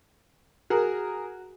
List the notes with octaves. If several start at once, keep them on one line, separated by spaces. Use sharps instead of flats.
F#4 G#4 A#4